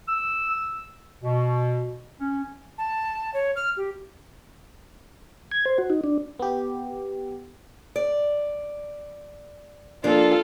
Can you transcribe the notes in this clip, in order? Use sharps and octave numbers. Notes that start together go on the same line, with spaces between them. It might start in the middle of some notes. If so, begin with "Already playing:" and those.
E6
B2
C#4
A5
C#5
F6
G4
G#6
C5
F#4
D#4
D4
B3 G4
D5
F3 A#3 D4 F4 A4